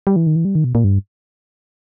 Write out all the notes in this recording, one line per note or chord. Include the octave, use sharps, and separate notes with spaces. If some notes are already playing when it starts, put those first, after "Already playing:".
G3
E3
D#3
E3
G3
D#3
B2
A#2
G2